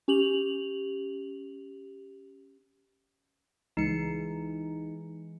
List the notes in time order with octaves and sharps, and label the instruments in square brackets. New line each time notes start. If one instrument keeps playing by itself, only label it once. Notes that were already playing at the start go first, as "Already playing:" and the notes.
[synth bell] C#4 G4 F7 F#7
[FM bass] C#2 [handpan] E3 G#3 [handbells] D#4 C#7